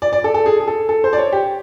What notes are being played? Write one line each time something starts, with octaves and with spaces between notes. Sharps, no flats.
D5
D5
A4
A4
G#4
G#4
A4
A4
C5
D5
C#5
G4